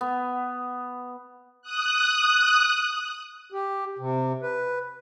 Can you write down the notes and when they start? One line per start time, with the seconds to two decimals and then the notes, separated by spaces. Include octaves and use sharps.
0.01 B3
1.62 D#6 F#6
3.52 G4
3.99 C3
4.42 B4